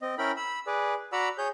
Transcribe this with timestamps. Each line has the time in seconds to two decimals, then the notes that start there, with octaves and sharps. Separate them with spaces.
0.02 C4 D#5
0.18 C#4 E4 A#4 G5 B5
0.37 B5 E6
0.67 G#4 B4 D5
1.12 F#4 D5 F#5 A#5 B5 E6
1.38 G#4 C#5 G6